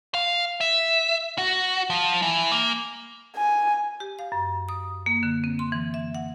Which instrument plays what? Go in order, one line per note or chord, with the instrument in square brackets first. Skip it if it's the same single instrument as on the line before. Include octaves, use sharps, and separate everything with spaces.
[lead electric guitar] F5
E5
F#4
F3
E3
A#3
[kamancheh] G#5
[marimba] G4
F5
F#2
D#6
A#3
D3
C4
C6
E3
E5
F#5